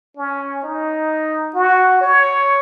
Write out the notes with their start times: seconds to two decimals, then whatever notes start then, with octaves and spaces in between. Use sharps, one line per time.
0.17 C#4
0.63 D#4
1.55 F#4
2.01 C#5